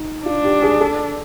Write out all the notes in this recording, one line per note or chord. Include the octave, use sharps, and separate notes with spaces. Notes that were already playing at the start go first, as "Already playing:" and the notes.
Already playing: D#4
D4 F4
G4
G#4
A4